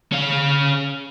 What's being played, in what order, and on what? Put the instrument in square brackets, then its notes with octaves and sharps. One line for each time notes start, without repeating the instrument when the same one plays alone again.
[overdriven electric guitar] C#4 F5